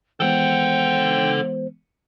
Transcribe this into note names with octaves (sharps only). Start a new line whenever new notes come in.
E3 G#3 B3 A4 C5 F#5 G5